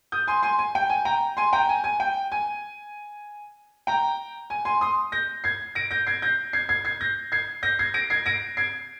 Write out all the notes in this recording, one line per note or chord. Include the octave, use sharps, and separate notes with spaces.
D#6 G6
G#5 C6
G#5 C6
G#5
G5
G#5
G5 A#5
G#5 C6
G5 A#5
G#5
G#5
G5
G#5
G5 A#5
G#5
G#5 C6
C6 D#6
G6 A#6
G#6 C7
A#6 D7
G6 A#6
G#6 C7
G6 A#6
G#6 C7
G#6 C7
G#6 C7
G6 A#6
G#6 C7
G6 A#6
G#6 C7
A#6 D7
G#6 C7
A#6 D7
G#6 C7